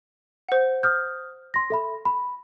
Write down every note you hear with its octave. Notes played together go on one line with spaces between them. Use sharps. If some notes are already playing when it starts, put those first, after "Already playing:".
C5 F#5
D#6 F6 G6
C6 A#6
A4 E5 B5
B5